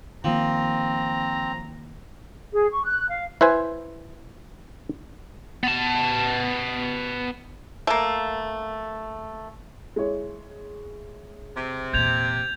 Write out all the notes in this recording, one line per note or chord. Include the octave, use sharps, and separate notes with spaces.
D#3 F3 A#3 C4 A#5
G#4
C#6
F#6
F5
E4 B4 C5 G#5
B3 A5
A3 A#3
G#3 E4 C#5
C3
E2 A#2 G6 G#6 F7